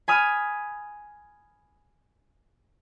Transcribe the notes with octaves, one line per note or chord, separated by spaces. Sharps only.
G#5 B5 D#6 F6